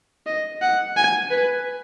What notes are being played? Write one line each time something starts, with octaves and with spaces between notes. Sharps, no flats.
D#5
F#5
G#5
B4